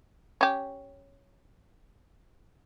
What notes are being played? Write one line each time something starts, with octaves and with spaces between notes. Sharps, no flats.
C#4 G4